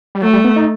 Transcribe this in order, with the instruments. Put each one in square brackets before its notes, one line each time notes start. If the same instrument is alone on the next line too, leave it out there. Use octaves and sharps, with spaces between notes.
[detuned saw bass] G3
[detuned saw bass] F#3 [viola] A3
[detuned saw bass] G3
B3
D#4